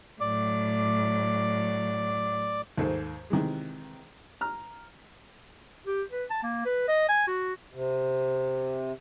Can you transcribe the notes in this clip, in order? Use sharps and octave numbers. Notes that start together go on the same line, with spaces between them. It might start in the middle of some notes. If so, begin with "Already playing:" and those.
A2 F#3 D5 D6
D#2 G#2 A4 C5
C3 D#3 E3 G#3
A#5 F6
G4
B4
A5
A#3
B4
D#5
G#5
F#4
C3